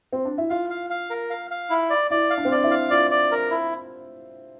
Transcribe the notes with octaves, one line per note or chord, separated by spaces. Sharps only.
C4
D4
E4
F4 F5
F5
F5
A#4
F5
F5
E4
D5
E4 D5
F5
D4
C4
D4 D5
E4
F5
F4 D5
D5
A#4
E4